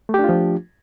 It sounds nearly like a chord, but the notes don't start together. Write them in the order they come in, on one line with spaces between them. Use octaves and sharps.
A3 G4 D4 F4 F3